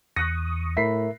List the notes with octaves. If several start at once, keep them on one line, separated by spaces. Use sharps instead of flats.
E2 C#6 D#6 F#6 A#6
A2 A#4 E5 B5 B6 C7